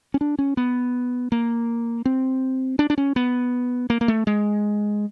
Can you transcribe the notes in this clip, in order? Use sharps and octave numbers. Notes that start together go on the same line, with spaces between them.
C#4
D4
C#4
B3
A#3
C4
D4
D4
C#4
B3
A#3
A#3
A3
G#3